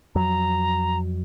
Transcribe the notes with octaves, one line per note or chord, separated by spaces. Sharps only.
F2 F#3 A#5